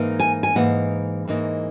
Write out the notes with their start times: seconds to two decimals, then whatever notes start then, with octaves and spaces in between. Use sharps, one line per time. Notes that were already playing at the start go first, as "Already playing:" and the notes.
Already playing: G#2 E3 A#3 D#4
0.20 G#5
0.43 G#5
0.55 G#2 E3 A#3 D#4 F#5
1.27 G#2 E3 A#3 D#4